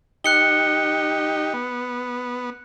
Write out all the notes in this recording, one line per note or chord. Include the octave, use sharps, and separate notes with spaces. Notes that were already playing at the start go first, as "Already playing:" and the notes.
D#4 G4 F#6 C#7 G7
B3